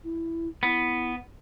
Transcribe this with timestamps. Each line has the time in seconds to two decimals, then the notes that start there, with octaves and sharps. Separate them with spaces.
0.04 E4
0.63 B3 E4